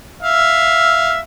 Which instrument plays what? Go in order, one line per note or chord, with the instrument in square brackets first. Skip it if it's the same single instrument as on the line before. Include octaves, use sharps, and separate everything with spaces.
[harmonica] E5 F5